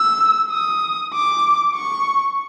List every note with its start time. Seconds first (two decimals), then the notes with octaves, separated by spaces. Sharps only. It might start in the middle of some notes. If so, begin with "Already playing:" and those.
Already playing: E6
0.51 D#6
1.13 D6
1.75 C#6